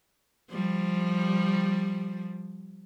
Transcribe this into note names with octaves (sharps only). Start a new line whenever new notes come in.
F3 G3